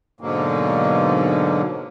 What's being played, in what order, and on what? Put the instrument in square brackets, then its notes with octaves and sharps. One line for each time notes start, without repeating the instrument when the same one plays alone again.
[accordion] G#2 B2 D3 F#3 A#3